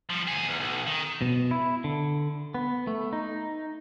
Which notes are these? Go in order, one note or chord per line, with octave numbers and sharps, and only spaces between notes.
F3 G3
D2 G#4
E2
B1
D#3
B2
E4
D3
B3
A3
D#4